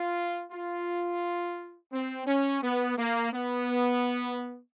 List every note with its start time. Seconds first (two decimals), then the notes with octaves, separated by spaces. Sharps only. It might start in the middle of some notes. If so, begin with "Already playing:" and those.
Already playing: F4
0.52 F4
1.93 C4
2.27 C#4
2.63 B3
2.98 A#3
3.33 B3